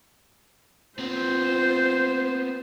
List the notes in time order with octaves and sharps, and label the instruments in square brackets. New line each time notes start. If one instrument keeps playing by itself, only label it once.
[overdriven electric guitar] B3 C4 [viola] F4 C5